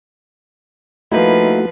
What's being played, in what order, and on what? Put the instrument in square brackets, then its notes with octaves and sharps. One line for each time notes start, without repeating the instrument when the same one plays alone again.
[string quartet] F3 B4 [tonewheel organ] A3 F#4 [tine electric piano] A#3 D#4 E4